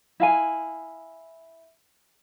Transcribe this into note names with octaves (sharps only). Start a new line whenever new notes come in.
E4 F5 G#5